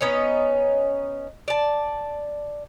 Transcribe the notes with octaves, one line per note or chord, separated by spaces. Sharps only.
B3 C#4 D#4 C#5
D5 A5